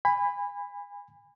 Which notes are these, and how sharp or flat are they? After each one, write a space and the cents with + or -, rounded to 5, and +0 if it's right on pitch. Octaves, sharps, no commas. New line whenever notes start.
G#5 -30 B5 +10